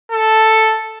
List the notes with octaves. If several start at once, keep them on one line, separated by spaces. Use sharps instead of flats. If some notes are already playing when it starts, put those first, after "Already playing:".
A4